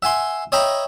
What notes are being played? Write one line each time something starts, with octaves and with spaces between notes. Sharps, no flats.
E5 F#5 G#5 C6
C#5 D#5 E5 G5 A#5 B5